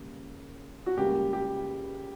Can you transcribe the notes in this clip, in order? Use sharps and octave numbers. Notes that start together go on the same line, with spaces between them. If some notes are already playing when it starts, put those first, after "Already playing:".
Already playing: C#2 C#3 G3 A#3
F#4
C#2 C#3 G3 A#3 G4
G4